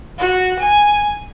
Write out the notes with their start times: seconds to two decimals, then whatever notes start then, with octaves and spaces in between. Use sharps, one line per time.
0.19 F#4
0.60 G#5